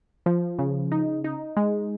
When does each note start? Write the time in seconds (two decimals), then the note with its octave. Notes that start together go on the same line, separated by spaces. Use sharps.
0.26 F3
0.59 C#3
0.92 D#4
1.24 D#4
1.57 G#3